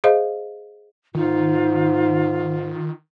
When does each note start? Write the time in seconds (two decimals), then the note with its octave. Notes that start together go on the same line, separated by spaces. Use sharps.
0.04 G#4 C5 D#5 F5
1.15 G#2 D#3 D#4 F4